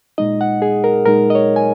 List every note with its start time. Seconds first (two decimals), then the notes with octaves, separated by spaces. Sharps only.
0.18 A#2 G#3 D#4 D#5
0.41 F#5
0.62 G#4
0.84 A#4
1.05 A#2 G#3 D#4 A#4
1.30 D#5
1.35 C#5
1.56 G#5